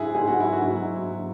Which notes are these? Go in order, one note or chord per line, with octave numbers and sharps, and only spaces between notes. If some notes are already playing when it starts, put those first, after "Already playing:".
Already playing: G#2 F#3 E4 F#4 G#4
G#2 F#3 G#4
F#4
E4
F#4
G#2 F#3
F#3